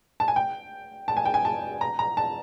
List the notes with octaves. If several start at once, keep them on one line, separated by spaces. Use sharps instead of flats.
A5
G#5
G5
A5
G#5
G5
G#5
A5
A#5
A#5
A5